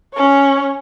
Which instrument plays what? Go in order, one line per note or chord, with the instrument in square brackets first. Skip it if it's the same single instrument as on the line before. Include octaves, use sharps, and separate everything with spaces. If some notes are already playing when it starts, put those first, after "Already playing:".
[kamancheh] C#4 C#5